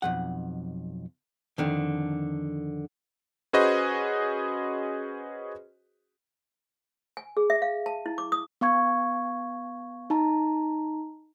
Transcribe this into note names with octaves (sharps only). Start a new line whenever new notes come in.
B1 F2 F#5
F2 D3 D#3
C#4 F#4 G#4 B4 C5 D#5
G#5
G#4
E5
F5
A5
E4
D6
D#6
B3 F5 C#6 G#6
D#4 A5 A#5